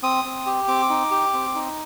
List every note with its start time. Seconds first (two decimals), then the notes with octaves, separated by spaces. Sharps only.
0.03 C4 D#6
0.25 C4
0.46 G4
0.68 C4 D6
0.90 D#4
1.11 G4
1.34 C4
1.55 D#4